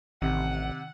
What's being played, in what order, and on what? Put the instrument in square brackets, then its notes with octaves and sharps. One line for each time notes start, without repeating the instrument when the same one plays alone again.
[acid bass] A1 [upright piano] C3 [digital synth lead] D#3 [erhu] F#5